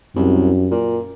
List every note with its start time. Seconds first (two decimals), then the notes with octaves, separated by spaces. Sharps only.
0.16 C2 F#2
0.71 A#2